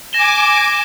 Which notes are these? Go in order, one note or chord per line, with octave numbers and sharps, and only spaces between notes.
G#5 D6 A#6 E7 G7